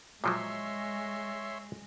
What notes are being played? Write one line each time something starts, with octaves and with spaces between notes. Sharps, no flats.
A#2 F3 F#3 G#3 C#5 E5 C6